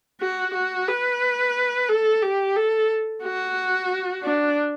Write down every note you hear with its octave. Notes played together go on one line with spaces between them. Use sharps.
F#4
F#4
B4
A4
G4
A4
F#4
D4